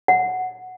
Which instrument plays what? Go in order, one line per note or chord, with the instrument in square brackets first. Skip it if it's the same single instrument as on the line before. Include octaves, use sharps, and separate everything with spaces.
[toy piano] F#5